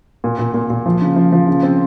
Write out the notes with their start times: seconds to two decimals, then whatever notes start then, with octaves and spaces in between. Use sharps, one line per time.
0.24 A#2
0.39 A#2
0.54 A#2
0.70 A#2
0.86 F3
1.02 C#3
1.16 F3
1.32 F3
1.48 C#3
1.63 C4